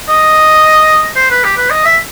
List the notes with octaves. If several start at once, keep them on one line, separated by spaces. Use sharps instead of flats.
D#5
C5
B4
G4
B4
D#5
E5